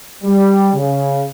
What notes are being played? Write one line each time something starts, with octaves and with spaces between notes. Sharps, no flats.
G3
C#3